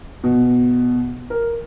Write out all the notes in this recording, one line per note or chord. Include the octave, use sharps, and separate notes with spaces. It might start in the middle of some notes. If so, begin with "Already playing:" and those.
B2
A#4